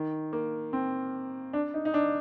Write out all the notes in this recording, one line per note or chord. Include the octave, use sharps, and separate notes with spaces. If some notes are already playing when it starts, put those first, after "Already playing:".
Already playing: D#3
A#3
C4
D4
D#4
D#4
D4